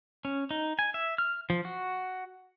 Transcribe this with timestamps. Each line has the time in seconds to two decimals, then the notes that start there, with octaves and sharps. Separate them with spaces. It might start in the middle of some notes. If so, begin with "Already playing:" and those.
0.25 C#4
0.51 D#4
0.79 G#5
0.94 E5
1.18 F6
1.50 F3
1.65 F#4